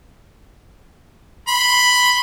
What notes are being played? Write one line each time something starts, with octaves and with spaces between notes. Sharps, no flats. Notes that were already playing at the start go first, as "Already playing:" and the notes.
B5 C6